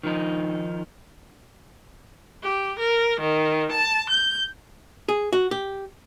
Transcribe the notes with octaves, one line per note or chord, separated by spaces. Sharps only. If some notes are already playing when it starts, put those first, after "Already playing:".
D#3 F3 D#4
G4
A#4
D#3
A5
G6
G#4
F#4
G4